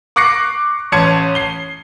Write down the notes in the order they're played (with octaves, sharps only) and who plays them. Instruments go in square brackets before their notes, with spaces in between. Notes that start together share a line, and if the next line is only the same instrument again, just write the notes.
[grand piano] C#6 D6 F#6 A#6 C7 C#7
A1 C#4 A5 C6 G#6 C#7
C7 G7